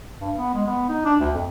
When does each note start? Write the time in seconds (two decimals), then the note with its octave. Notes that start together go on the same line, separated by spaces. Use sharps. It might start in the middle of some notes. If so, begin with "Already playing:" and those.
0.20 G2
0.37 B3
0.54 G#3
0.67 B3
0.89 D#4
1.05 D4
1.20 D2
1.34 F2